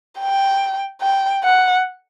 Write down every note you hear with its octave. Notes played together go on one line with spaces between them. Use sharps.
G5
G5
F#5